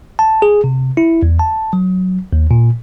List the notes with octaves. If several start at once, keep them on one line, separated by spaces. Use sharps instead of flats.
A5
G#4
C3
E4
E2
A5
F#3
D#2
A#2